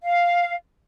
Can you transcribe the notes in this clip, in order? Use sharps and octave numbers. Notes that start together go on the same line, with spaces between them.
F5